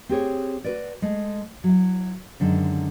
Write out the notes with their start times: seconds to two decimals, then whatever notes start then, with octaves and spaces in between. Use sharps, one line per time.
0.09 C4 G4 G#4 C#5
0.64 F#4 B4 D5
1.02 G#3 A3
1.64 F#3 E4
2.40 F#2 D3 D#3 G#3